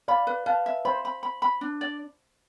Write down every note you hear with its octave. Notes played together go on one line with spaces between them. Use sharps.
D5 F5 B5
B4
B4 F5 A5
E5
C5 B5
B5
B5
B5
D4
D5